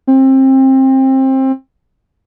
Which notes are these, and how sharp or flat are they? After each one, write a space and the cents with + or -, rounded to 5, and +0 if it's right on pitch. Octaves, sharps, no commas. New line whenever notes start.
C4 +25